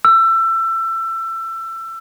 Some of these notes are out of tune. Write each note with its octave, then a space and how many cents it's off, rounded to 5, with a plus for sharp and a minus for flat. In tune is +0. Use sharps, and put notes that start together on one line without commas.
E6 +25